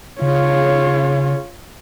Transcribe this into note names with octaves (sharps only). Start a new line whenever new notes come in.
C#3 F4 C#5